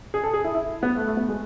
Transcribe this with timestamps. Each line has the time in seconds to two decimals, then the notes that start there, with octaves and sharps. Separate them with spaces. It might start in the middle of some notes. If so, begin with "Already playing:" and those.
0.14 G#4
0.24 A4
0.34 G#4
0.44 E4
0.55 E4
0.83 B3
0.97 A3
1.07 A3
1.17 B3
1.28 G#3